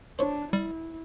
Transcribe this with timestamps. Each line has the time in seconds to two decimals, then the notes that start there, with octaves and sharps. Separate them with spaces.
0.19 D4 C5 C#5
0.53 G3 E4